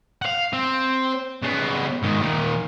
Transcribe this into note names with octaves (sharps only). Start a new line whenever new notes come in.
F5 F#5
C4
C#3 B3
G#2 D#3
A#2 D#3